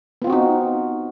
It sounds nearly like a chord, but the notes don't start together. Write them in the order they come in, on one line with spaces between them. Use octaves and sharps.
B3 F4 C4 F#4 D#4